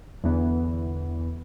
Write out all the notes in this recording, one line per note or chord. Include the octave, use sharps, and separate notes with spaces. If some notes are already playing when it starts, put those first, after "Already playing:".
E2 D3 E3 B3